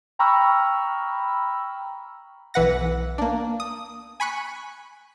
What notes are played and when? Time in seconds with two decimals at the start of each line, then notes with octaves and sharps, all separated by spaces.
0.19 G5 A#5 B5 C#6 E6 F6
2.54 B1 E3 B4 F#5 A#6
3.18 A#3 D4
3.60 D#6
4.20 G#5 B5 C#6 F#6